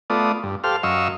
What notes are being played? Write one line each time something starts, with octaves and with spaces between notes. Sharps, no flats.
A3 B3 F4 D5 D#6
G2
G4 A4 C5 F5 F6
F#2 D#5 F5 C#6 E6